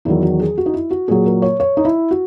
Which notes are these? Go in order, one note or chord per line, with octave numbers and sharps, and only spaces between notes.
E2 D#3 F#3 E4
F#4
G#4
F#4
D#4
E4
F#4
A#2 F#3 G#4
A#4
C#5
C#5
D#4
E4
F#4